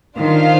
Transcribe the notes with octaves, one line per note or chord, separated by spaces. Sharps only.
D#3 D4 F4 C5 F5